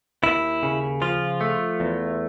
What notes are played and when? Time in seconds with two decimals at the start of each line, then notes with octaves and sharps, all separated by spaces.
0.23 D#2 E4
0.63 C#3
1.02 F3 F4
1.41 A3
1.80 E2